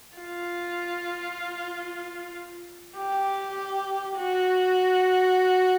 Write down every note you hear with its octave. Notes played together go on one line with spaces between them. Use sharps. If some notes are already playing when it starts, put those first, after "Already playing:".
F4
G4
F#4